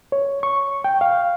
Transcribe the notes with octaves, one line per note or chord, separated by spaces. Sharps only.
C#5
C#6
G5
F5